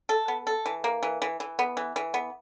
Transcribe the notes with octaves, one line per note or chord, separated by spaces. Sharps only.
A4
B3
A4
E3
A#3
E3
E3
E3
B3
E3
E3
B3